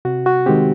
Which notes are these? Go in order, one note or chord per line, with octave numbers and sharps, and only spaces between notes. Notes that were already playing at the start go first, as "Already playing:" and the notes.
C3 F#4
F#4
D#3 G#3 C4 G4